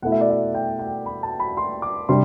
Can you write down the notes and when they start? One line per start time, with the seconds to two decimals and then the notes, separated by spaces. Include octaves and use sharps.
0.02 B2 A3 E4 F#5
0.12 E5
0.21 D5
0.30 E5
0.55 G5
0.79 G5
1.06 B5
1.23 A5
1.40 B5
1.57 C6
1.82 D6
2.09 C3 G3 D4 C6